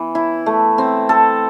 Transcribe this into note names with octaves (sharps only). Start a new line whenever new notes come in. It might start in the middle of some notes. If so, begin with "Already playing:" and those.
Already playing: E3 B3
E4
A3
C4
A4